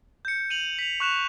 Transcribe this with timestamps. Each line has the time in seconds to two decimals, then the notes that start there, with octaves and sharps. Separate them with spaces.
0.25 G6 C#7
0.50 D#7 F7 F#7
0.79 B6 F7
1.00 C#6 F#6 E7 F7